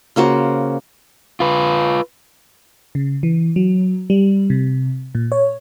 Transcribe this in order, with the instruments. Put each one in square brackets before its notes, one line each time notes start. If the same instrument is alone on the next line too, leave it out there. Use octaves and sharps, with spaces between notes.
[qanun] C#3 A#3 F#4 C5
[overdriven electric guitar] F4 B4
[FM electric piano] C#3
E3
F#3
G3
C3
A#2
C#5